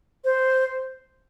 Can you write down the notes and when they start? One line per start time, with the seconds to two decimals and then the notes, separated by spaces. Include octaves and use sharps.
0.25 C5